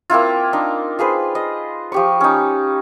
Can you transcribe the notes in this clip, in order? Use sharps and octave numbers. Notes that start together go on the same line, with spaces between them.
A#3 C4 E4 F4
D4 D#4
F4 G#4 B4 C5
D#5
F3 G4 C#6
C#4 D#4